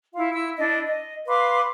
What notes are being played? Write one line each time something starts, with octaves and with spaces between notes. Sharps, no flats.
E4 F4 F5
E4 E6
D4 E4 D#5
D#5
B4 F5 C6 D6